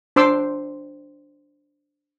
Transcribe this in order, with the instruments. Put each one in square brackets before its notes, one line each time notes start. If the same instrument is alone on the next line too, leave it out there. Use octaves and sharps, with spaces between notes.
[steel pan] D4 C5 C6 D6 E6